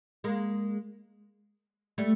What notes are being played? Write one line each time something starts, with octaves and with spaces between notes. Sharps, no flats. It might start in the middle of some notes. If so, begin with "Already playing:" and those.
G#3 A#3
G3 A3